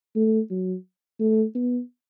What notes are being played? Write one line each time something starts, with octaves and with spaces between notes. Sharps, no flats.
A3
F#3
A3
B3